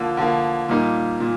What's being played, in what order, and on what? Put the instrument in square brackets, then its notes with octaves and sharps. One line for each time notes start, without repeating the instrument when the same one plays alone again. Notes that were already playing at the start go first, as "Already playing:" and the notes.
Already playing: [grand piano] D3 F3 A#3
D3 F3 A#3
A#2 G3 A#3 D#4
A#2